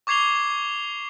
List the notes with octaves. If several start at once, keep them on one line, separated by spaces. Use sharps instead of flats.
C#6 D6 G#6 C7 F7 G7